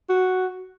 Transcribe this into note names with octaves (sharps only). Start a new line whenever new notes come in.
F#4